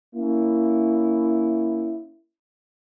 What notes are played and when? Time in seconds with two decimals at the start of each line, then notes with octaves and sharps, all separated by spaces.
0.14 A#3 C#4 E4